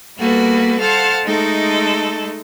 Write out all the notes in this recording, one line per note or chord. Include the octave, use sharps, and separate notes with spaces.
G3 A#3 B3 F#4 A4 B4
A4 C5 F5 F#5 A5
G#3 A3 D#4 A4